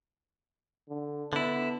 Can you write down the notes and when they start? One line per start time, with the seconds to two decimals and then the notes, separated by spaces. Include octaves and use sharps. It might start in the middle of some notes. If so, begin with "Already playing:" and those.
0.89 D3
1.33 D3 B3 E4